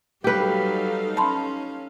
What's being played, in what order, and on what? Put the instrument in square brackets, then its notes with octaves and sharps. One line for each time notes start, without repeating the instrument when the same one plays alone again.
[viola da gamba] F#3 G3 [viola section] D#4 A4 F5 [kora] G4 B4
[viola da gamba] C#4 [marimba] A5 B5 C6